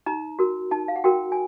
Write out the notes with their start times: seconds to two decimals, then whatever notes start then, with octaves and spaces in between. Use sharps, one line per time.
0.06 D#4 A#5
0.39 F#4 A#4
0.71 D#4 A5
0.88 F5
0.96 F#5
1.04 F#4 A#4 G5
1.32 G#5